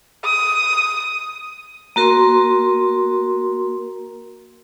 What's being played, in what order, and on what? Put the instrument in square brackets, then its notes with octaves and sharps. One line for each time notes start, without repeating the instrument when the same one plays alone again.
[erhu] D#6
[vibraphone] A#3 F#4 A#4 C6